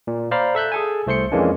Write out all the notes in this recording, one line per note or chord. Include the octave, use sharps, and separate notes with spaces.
A#2
C5 D5 F5 A#5 B5
A4 E5 F#6 G6
G#4 A4 G#5
C2 A3 C5 C6 C#7
F2 E3 G#3 A#3 C#4 D4